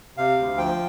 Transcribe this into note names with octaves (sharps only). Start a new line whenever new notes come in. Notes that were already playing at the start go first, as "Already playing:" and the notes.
C3 F5
D2
F3 G5